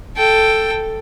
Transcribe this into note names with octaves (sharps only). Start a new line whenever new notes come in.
A4 G5